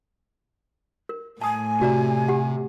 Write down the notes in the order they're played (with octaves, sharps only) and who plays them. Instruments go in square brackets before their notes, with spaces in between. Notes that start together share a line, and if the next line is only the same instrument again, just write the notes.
[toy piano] A#4
[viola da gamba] A2 [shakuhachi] G#5 [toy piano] A5 D#6
[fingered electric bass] C3 [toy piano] F#4 D5 A#5
[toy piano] G4 F#5